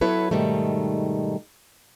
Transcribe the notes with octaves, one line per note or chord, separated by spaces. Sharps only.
F#3 B3 E4 A4 B4 C#5
G#2 B2 D#3 G3 A3